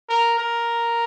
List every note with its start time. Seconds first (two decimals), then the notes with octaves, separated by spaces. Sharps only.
0.09 A#4
0.38 A#4